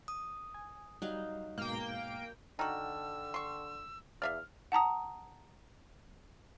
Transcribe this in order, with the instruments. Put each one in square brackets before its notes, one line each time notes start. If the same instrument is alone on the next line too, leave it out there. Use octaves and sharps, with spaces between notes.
[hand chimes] D#6
[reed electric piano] G#5
[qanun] F#3 D#4 F5 [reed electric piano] G3
[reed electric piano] G#2 B2 [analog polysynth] A#3 G5
[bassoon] D3 [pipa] D#4 F#4 [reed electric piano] G5 A5 F6 [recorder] E6
[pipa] C6 C#6
[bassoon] E2 [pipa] D5 E5 F5 [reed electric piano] F6
[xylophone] F#5 A5 A#5 D#6